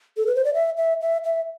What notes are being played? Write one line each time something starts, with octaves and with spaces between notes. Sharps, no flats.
A4
B4
C5
D5
E5
E5
E5
E5